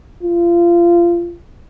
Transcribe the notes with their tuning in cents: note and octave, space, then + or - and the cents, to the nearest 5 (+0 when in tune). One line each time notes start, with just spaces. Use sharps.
F4 -25